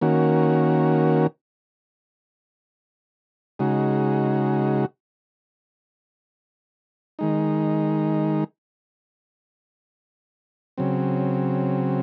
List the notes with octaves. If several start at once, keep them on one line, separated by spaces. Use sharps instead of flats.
D#3 A#3 C#4 F#4
C#3 G#3 D#4 F#4
D#3 G#3 D#4
C#3 F#3 C4